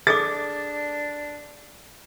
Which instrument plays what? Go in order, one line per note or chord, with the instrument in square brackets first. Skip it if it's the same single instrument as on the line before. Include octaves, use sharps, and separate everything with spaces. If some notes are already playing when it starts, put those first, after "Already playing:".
[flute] D4 [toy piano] G#4 A4 D6 [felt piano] A6